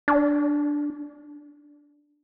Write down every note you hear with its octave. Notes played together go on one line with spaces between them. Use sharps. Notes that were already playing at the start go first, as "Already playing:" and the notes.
D4